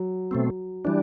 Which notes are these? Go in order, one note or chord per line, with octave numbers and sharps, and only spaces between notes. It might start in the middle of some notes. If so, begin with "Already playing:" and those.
Already playing: F#3
B2 A3 C4
E3 G3 D4